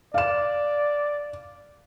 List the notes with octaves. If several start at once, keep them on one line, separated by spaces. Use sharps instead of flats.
D5 F5 E7